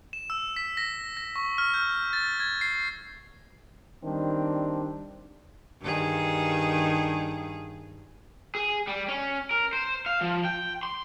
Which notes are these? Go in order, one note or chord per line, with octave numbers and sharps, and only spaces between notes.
E7
E6
B6
A#6
A#6
C#6
F6
G6
A6
G#6
C7
D#3 G3 C4 D4
G2 D#3 G#4
G#4
G3
C#4
A#4
C5
F5
F3
G5
C6